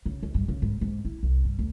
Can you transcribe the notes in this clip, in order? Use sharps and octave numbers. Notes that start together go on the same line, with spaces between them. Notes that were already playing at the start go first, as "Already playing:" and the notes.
C#3
C#2
G2
C#3
G#2
G#2
E4
C2
G2
D2